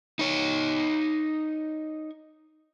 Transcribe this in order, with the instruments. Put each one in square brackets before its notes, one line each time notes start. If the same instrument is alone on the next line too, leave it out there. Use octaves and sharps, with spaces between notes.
[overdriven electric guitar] D#4 C#5